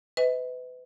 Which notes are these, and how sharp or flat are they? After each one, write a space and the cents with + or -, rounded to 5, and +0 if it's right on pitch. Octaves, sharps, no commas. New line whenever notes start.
B4 +35 D#5 +35